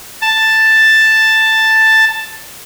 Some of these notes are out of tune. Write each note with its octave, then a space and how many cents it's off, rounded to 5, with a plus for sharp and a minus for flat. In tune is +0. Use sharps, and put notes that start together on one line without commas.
A5 +5